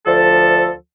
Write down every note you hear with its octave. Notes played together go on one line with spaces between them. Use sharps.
D2 F3 A4